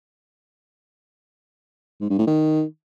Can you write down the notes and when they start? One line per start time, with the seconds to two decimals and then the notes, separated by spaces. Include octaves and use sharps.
2.01 G#2
2.10 G2
2.18 A2
2.27 D#3